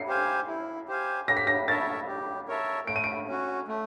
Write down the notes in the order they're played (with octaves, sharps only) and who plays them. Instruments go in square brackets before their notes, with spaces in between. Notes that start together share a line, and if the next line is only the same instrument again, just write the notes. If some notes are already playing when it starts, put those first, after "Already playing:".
Already playing: [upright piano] C7 C#7
[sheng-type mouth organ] G4 C5 F5 G#5
E4
G4 C5 F5 G#5
[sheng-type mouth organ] G4 [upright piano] A#6
[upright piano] B6
A#6
[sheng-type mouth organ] A#4 C#5 E5 A5 [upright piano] A6
[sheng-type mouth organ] G4
A#4 C#5 E5 A5
[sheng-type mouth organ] A3 [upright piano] D7
[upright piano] D#7
D7
[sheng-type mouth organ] C#4 F#4
A3